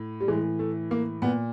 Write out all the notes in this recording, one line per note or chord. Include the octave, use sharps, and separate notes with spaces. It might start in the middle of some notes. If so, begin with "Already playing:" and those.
Already playing: A2
G3
A2 E3 G#3
A3
A#3
A#2 B3